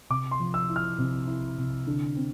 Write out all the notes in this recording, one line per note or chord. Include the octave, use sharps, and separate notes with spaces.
C3 D6
C6
F3
E6
E4
F6
C3
E4
C3
D3
C4